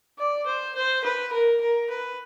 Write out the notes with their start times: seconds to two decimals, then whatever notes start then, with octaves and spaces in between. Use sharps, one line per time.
0.18 D5
0.46 C5
0.75 C5
1.04 B4
1.32 A#4
1.61 A#4
1.90 B4